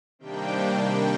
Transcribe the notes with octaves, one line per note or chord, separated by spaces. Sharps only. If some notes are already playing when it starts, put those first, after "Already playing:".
C3 D#3 G3 A#3 D4 G5